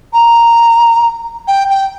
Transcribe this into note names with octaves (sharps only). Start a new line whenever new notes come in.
A#5
G5
G5